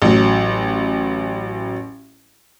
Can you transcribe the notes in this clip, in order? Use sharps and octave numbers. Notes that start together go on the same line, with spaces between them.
A1 F#3